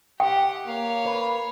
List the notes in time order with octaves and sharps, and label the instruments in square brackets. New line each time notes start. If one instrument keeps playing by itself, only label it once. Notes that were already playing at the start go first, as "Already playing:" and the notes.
[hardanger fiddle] G4 F#5 [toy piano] G5
[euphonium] A#3 [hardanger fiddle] C#5 F5
[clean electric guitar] B4